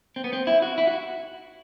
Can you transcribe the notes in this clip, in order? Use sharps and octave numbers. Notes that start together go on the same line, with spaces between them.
C4
B3
C4
E4
F#4
E4
F#4